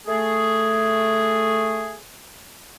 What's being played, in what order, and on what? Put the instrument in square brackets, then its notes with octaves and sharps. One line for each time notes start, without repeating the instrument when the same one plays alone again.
[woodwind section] A3 G#4